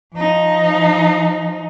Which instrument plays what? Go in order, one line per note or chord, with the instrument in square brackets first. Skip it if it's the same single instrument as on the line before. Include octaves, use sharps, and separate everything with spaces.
[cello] F3 D#4